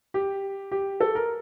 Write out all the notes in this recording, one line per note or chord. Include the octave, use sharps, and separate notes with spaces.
G4
G4
A4
A#4